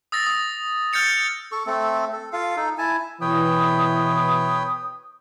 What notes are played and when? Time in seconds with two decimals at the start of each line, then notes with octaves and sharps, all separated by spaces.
0.12 D#6 E6 A6 A#6
0.27 D#6
0.93 F6 G6 A6 C#7 F7
1.52 A4 C#6
1.66 A3 C4 A4
2.13 A4
2.33 F4 A4 F5
2.56 D#4 A4
2.78 E4 G#5 A5
3.21 B2 E3 B4 C#5 G5 D#6